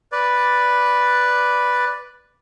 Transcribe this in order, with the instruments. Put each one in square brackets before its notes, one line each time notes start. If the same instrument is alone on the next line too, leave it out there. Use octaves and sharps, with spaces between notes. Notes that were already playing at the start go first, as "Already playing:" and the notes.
[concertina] B4 D5